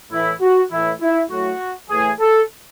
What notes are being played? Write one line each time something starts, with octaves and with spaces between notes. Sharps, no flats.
A2 E3 E4
F#4
A2 E3 E4
E4
A2 F#3 F#4
A2 E3 G#4
A4